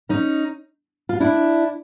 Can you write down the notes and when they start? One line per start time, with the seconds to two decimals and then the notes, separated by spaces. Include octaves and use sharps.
0.09 C#4 D#4
1.09 F4
1.20 D4 E4